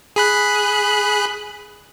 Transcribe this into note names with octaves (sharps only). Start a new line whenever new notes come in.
G#4 B5 F#6